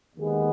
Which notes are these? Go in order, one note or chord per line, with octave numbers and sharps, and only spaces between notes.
D#2 D#3 G#3 B3 G#4